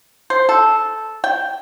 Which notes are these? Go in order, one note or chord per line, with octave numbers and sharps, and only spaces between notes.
C5
A4
G5